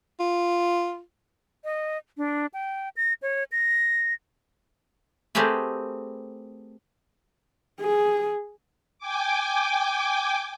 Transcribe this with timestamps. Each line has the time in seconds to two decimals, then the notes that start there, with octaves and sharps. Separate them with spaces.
0.20 F4
1.64 D#5
2.18 D4
2.54 G5
2.97 A#6
3.22 C#5
3.52 A#6
5.35 A3 C4 G4 G#4 A#4 B4
7.81 G#4
8.99 G5 G#5 D6